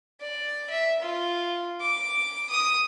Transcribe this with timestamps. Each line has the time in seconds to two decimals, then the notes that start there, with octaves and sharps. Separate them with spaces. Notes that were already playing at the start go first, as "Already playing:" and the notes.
0.21 D5
0.70 E5
1.02 F4
1.81 D6
2.50 D#6